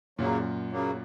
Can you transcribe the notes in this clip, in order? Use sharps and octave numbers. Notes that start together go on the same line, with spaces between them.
F#2 A#2 C#3 F#3 A#3
C#3 F#3 A#3